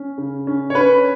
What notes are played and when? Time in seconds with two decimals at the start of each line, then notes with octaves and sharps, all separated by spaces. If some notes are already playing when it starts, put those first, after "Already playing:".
Already playing: C#4
0.18 C#3
0.47 C#4
0.70 C#5
0.75 C#4 B4